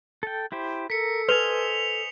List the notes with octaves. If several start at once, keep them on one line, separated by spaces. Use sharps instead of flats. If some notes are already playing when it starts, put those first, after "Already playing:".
A4 G5
E4 G4 C5
A4 A#4 B6 C#7
B4 C5 D#5 G#5 F7 G7